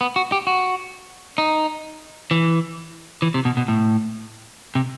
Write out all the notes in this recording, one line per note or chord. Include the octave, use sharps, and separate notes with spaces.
B3
F#4
G4
F#4
D#4
E3
E3
C3
B2
B2
A2
C3